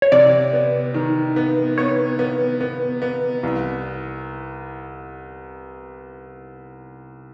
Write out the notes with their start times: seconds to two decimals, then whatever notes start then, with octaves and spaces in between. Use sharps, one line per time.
0.02 C#5
0.12 C3 D5
0.53 B3
0.94 D#3
1.36 B3
1.78 B3 C#5
2.19 B3
2.61 B3
3.02 B3
3.43 C2